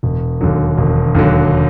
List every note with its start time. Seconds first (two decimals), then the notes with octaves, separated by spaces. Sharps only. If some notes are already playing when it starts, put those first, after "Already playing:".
0.03 E1
0.41 D#2 D3 F#3
0.78 E1
1.15 D#2 D3 F#3